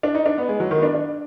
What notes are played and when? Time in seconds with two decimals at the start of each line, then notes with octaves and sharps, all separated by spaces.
0.03 D4
0.15 D#4
0.26 D4
0.38 B3
0.48 G#3
0.60 F#3
0.71 D#3
0.78 B3
0.83 D4
0.95 D4